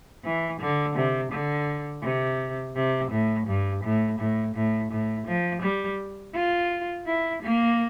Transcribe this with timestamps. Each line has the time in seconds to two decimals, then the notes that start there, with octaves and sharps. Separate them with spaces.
0.24 E3
0.60 D3
0.95 C3
1.31 D3
2.03 C3
2.75 C3
3.11 A2
3.47 G2
3.84 A2
4.19 A2
4.55 A2
4.91 A2
5.27 F3
5.62 G3
6.34 F4
7.06 E4
7.43 A#3